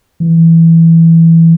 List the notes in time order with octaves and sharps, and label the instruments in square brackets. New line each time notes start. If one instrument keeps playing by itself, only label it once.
[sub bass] E3